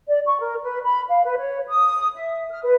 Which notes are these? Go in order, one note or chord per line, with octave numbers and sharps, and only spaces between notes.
D5
C#6
A#4
B4
B5
F5
B4
C#5
D#6
E5
F6
B4